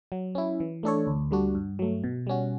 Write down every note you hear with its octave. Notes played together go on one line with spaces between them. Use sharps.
F#3
C#4 E4
E3
A3 D4 A4 C#5
D2
D3 G3 D4 F#4
G2
F#3 A3
B2
G3 C#4 F#4